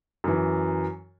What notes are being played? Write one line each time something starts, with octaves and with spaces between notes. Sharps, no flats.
F#2 E3